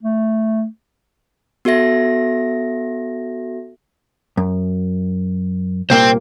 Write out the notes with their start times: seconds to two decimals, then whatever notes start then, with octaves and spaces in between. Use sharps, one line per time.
0.03 A3
1.65 B3 F#4 A4 E5 A#6
4.37 F#2
5.90 C2 A#2 A#3 C5 G5